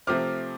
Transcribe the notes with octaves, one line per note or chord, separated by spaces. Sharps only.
C3 F3 A3 C4 D6 F6